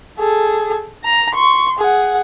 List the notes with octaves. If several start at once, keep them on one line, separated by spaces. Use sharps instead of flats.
G#4 A4
A#5
C6 C#6
G#4 F#5